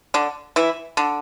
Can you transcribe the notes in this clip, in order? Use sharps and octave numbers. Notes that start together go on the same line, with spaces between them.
D3 D4
E3 E4
D3 D4